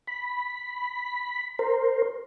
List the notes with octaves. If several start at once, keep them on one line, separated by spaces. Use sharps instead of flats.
B5
A#4 C5